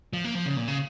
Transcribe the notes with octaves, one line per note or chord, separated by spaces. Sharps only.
F3
A#3
F3
C#3
A#2
C#3